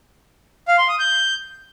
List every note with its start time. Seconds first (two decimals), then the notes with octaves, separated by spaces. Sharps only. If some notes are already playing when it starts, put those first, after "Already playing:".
0.68 F5
0.78 C6
0.89 D#6
0.99 G6